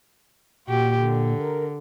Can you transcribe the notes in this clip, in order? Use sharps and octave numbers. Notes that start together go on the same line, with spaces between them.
A#2 F#4 G4
D3
A#4